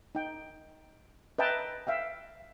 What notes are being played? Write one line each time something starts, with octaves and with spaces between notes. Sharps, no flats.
D#4 G5
B4 D#5 E5 G5 A5 A#5
E5 F5 G5